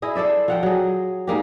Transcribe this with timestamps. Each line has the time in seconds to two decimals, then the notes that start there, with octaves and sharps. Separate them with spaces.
0.02 E4 G#4 D#5
0.15 A4 C5 D5 E5
0.48 F3 F#5 G5
0.63 F#3 G#4
1.27 G#2 G#3 A#3 G4